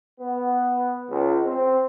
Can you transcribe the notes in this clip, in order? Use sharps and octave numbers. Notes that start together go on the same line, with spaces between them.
B3
C#2
C4